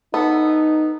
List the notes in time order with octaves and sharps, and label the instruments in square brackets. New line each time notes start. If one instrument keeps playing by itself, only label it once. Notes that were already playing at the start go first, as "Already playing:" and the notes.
[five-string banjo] B3 A4 [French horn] D#4